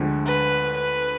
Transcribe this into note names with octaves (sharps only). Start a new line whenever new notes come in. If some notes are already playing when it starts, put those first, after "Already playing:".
Already playing: D2 D3 F3 G#3
B4
B4